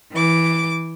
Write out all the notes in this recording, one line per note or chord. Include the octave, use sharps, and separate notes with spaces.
E3 D6